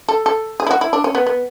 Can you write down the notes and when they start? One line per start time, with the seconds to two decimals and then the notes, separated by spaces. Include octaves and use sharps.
0.09 A4
0.26 A4
0.60 G#4
0.67 E4
0.71 F#4
0.81 E4
0.93 D4
1.04 C#4
1.15 B3
1.27 B3